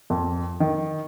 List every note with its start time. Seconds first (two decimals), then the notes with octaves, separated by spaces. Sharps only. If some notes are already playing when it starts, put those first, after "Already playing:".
0.10 F2
0.60 D#3